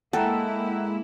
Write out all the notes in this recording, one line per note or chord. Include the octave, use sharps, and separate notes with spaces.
G#3 A#3 E4 A4 F#5 G5 A#5